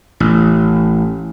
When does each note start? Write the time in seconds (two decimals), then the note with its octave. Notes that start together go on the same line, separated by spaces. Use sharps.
0.20 A1